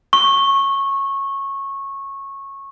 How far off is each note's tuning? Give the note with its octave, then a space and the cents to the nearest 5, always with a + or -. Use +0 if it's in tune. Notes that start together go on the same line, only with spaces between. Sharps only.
C#6 -15